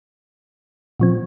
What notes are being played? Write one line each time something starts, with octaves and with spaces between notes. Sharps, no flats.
A#2 F3 C4